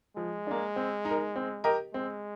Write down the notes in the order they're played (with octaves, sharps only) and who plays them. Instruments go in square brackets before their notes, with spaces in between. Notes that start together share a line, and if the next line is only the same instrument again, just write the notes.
[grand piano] F3 [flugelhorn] G#3
[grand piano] A#3 D4
C4
D#4 A#4
C4
G4 A#4 D#5
[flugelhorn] G#3 [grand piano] C4